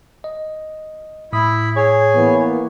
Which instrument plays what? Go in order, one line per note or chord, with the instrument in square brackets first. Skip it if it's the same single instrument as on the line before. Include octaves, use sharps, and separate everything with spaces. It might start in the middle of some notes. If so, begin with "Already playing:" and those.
[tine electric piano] D#5
[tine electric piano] A2 D#6 [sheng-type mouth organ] E4 B5
[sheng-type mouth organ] G#4 [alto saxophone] C#5
[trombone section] E3 A#3 B3